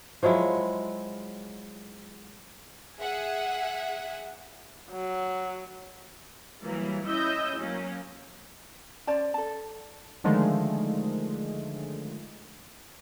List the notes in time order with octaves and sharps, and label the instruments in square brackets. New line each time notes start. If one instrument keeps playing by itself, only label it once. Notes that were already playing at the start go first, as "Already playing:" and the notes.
[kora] F3 F#3 G#3 E4
[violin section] G#4 E5 F#5
[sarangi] F#3
[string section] E3 F#3 G3 A#3
C#4 E4 D#5 E6 G6
F#3 A#3 C#4
[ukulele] C#4 C5 D5 A5
A4 A5
[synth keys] D3 D#3 F3 G#3 A3